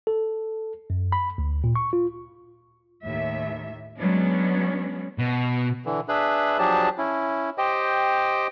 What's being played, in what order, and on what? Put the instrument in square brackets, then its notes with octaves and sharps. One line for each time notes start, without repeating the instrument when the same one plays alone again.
[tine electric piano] A4
F#2
B5
D2
A#2
C#6
F4
[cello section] D#2 A2 E5
F#3 G#3 B3 C#4 D4
[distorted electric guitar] B2
[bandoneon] D3 E3
D4 G#4 B4 E5 B5
F3 F#3 D4 G4 G#4 A5
C#4 E4
G4 C5 D#5 G5